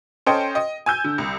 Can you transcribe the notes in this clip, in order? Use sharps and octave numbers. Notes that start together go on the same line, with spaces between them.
C#4 A4 C5 D#5 G5
D#5
G#5 E6 G6
D3
C2